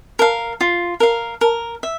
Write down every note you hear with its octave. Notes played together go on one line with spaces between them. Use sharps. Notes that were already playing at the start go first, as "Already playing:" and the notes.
A#4 F5
F4
A#4 F5
A#4
E5